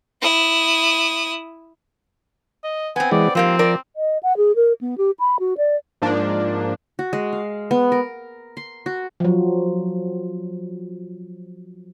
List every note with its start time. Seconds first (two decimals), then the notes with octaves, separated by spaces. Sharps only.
0.22 E4 D#6
2.64 D#5
2.96 B3 C4 G#5
3.11 E3 G#3 D5
3.35 G#2 F3 A#3 C4 G4
3.59 A#4 D5
3.96 D#5
4.23 F#5
4.37 G#4
4.56 A#4
4.81 B3
4.98 G4
5.20 B5
5.40 F#4
5.58 D5
6.02 G#2 F3 A#3 D4
6.99 F#4
7.13 G#3
7.33 F5
7.71 B3
7.92 A#4
8.57 C6
8.86 F#4
9.20 F3 F#3